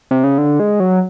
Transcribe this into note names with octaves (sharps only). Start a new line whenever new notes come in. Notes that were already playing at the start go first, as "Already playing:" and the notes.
C3
C#3
D3
G#3
F#3